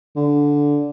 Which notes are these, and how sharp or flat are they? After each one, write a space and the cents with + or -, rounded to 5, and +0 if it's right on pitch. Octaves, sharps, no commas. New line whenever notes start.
D3 -10